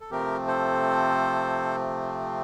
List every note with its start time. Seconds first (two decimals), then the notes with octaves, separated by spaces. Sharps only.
0.01 A4
0.11 C3 F3 A3 C4 G4 A#4
0.48 A4 C5